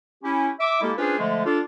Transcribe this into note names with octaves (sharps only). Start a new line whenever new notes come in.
C#4 E4 G4
E5 D6
G#3 A#3 E4 G4 A4
C#4 D4 F4 G#4 B4 C5
D3 F3 G#3 A3
D4 F4 A4